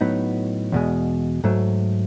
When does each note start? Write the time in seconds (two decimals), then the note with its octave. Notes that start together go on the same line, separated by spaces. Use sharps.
0.01 A2 F#3 B3 D#4
0.72 E2 B2 G#3
1.44 G#2 F#3 A3